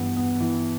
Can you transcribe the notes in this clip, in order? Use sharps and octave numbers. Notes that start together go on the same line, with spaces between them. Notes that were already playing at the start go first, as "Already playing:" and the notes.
Already playing: G2 E3 G3 B3
B3
E3